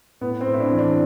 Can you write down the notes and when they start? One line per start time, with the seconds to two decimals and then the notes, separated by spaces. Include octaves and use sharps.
0.21 A2 B3
0.41 C4
0.47 A2
0.54 E4
0.60 D4
0.72 E3
0.79 D4